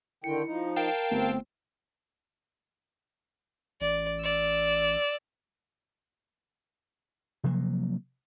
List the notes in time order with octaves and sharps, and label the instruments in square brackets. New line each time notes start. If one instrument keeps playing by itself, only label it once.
[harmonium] D3 D#3 G5 [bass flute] E4 [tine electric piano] C#7
[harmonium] F3 D#4
[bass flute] A#4 [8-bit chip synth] F5 G5 A5
[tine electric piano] G1 A3 B3 [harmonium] C4
[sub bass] A1 [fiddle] D5
[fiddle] D5 E6
[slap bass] C3 F3 F#3 A#3